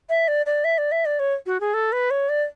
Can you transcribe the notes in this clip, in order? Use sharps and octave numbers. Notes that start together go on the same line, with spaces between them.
E5
D5
D5
E5
D5
E5
D5
C#5
F#4
G#4
A4
B4
C#5
D5